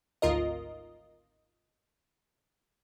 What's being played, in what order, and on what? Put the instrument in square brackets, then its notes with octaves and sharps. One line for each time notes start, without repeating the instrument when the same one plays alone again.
[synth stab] G#1 D2 F4 A#4 D#5